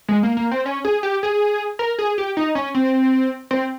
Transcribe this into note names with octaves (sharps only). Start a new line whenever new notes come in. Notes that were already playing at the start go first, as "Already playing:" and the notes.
G#3
A#3
A#3
C4
C#4
G#4
G4
G#4
A#4
G#4
G4
D#4
C#4
C4
C4